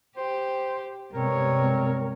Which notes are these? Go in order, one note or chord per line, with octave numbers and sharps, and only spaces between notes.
G4 C5
G2 C3 G#3 B3 C4 A#4 C#5